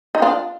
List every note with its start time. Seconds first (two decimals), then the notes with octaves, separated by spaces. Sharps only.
0.15 D#4
0.22 D4 F4